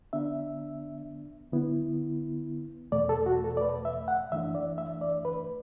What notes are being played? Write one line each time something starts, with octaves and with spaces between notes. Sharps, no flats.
D3 B3 D4 E5
D3 B3 E4
E2 B2 A3 D5
A4
F#4
A4
D5
B4
E5
F#5
F#2 E3 A3 D4 E5
D5
E5
D5
B4